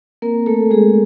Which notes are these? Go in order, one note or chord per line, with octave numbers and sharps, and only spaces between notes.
A#3 C4 A#4
A3 A4
G#3 A3 G#4